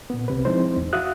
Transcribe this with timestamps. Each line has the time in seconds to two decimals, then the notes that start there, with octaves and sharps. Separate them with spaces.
0.10 A#2 B3
0.28 C2 C3 B4
0.45 F3 G#3 C4 D#4 E4 C5
0.77 E2
0.93 F#4 E5 F5 D#6 F#6